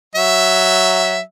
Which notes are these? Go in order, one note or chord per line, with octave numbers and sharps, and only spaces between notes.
F#3 E5